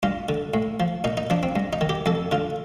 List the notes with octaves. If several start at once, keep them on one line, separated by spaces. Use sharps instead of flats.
G2 F4
D3
A2
F3
A#2 D#4
D#4
F3 D4
C4
G2
D#4
D#3
G4
F2 A4
D3 F4